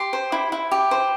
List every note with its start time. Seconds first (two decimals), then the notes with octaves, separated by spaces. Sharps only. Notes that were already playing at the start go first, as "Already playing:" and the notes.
Already playing: G4 C6
0.13 C5
0.32 E4
0.52 E4
0.71 G4
0.91 C5